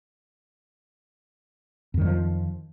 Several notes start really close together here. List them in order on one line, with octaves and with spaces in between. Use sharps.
F2 D#3 F#3 F3